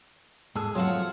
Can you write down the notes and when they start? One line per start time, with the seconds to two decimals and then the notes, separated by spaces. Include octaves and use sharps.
0.55 G#2 G#4 A4
0.75 F3 F#3 A3 C4 C#5 F5 F#5 A5